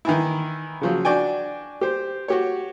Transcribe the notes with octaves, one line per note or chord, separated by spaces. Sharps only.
D#3 E3 E4
C#3 F3 F#3
D4 F#4 D5 G5 G#5
G4 C5
F#4 G4 C#5